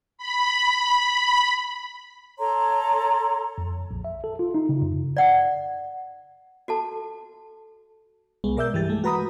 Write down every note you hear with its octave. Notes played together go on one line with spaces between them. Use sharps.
B5
A4 C#5 A#5 C6
F2
A#1
E5
A4
F4
D#4
C#3
F#2
D5 F#5
F#4 A4 A5
C2 G#3 B3
B2 A#4 D5 E5 E6 G6
G2 E3 G#3 G4 A6
G#3 A3
F#4 B4 A#5 B5 D#6